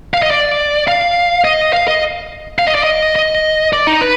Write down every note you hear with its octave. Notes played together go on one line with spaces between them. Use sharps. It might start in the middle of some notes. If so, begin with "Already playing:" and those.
F5
D#5
D5
F5
D#5
F5
D#5
F5
D#5
D5
D#5
D#5
D5
D#4
B4